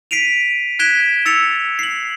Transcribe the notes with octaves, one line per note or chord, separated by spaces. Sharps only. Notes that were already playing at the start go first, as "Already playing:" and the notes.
B6 C7 D7 D#7 F7
F#6 G#6 B6 D7 E7 G7
E6 A6 C#7 F7
C7 F#7